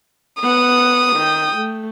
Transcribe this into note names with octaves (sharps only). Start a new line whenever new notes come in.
B3 F#5 D#6
D#3 G5
A3